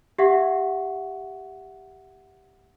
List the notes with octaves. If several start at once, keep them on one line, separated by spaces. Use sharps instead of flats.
G4 E5 F#5 C#6